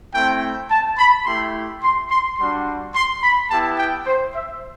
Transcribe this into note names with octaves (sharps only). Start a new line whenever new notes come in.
A3 C4 E4 G5
A5
B5
A3 E4 G4 C6
C6
C6
G3 D4 F#4 C6
C6
B5
B3 E4 G4 A5
G5
C5
E5